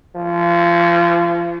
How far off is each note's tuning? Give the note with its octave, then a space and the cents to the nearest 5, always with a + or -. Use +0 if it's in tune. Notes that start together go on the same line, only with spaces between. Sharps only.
F3 -30